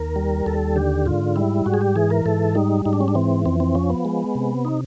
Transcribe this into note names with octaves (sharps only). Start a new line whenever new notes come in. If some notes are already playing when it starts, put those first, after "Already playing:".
Already playing: D#2 A#4
G3
D#2 A4
D3 G4
G#2 F4
G3 E4
G#2 F#4
G#4
G4
E3 G#4
A#4
G#2 A4
G3 D#4
G#2 D#4
D4
C#4
D4
E3 C4
F2 C4
C4
F3 C#4
B3
G#3
C3
D#4